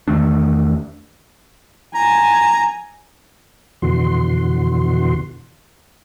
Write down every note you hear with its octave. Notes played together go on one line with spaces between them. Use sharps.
E2 D#3 A3 D4
G#5 A#5
F2 B2 D3 E3 F#4 C6